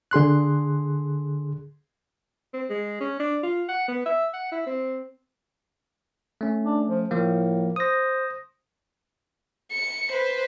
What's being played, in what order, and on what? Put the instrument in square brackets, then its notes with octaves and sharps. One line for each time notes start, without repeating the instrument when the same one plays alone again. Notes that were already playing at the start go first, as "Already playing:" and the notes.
[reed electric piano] D3 G#4 C6 F#6
[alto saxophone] C4
G#3
C#4
D4
F4
F#5
B3
E5
F#5
E4
C4
[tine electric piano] A3 C#4
[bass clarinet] D4
F3
[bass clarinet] A2 [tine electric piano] F3 A#3
[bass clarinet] C5 [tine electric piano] D#6 A#6
[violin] C#7
B4 C5